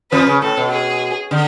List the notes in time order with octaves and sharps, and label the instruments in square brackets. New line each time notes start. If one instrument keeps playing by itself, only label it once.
[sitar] F2 F3 [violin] B4
[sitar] C#3
[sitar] A2 [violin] A4
[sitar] B2
[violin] G#4
[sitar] D3